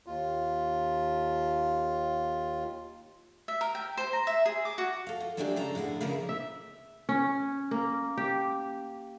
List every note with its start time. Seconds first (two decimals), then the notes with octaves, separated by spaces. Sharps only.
0.06 D#2 F4
3.48 E5
3.61 A#4
3.75 G5
3.97 C5
4.13 A#5
4.27 E5
4.46 G#4
4.65 D6
4.78 F#4
5.07 A4 F5
5.20 F4
5.37 F#3 G#3 A3 D4 F#4 G4
5.56 C#3 A4 A#5
5.75 A2 D3 G#4 F#5
6.01 C#3 F3 A#3 E4 G#4 A#4
6.29 E5
7.09 C#4
7.71 A#3
8.17 G4